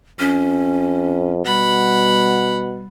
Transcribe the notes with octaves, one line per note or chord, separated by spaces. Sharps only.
F2 C#4
B2 G3 F#5 B5